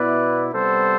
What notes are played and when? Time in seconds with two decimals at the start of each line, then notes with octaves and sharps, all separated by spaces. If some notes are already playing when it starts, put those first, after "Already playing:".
Already playing: B2 B3 E4 B4 D5
0.53 C3 G3 B3 A4 C5